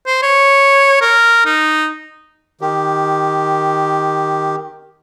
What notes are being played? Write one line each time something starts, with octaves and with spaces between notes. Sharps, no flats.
C5
C#5
A#4
D#4
D#3 G4